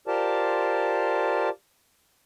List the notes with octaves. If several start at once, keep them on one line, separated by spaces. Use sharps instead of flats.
F4 G4 A#4 C5 D5 A5